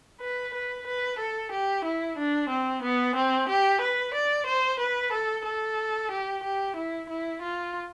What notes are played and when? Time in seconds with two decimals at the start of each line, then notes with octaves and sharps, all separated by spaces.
0.20 B4
0.54 B4
0.86 B4
1.19 A4
1.51 G4
1.84 E4
2.18 D4
2.49 C4
2.83 B3
3.16 C4
3.48 G4
3.81 B4
4.14 D5
4.47 C5
4.79 B4
5.12 A4
5.45 A4
6.11 G4
6.43 G4
6.76 E4
7.09 E4
7.42 F4